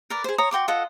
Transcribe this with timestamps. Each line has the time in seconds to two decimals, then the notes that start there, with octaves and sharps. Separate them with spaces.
0.10 A#4 B4 D5
0.24 G#4 C5
0.38 C#5 A#5 D#6
0.51 F#4 G5 C6 D6
0.68 F4 A4 D#5 F#5